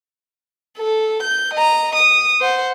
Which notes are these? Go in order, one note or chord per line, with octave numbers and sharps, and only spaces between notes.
A4
G6
D#5 A#5
D#6
C5 F#5